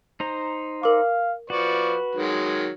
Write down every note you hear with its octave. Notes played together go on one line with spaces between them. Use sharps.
D#4 C5 A#5
A#4 F5 D6
F3 F#4 B4 D5 C#6
D#3 F#3 G#3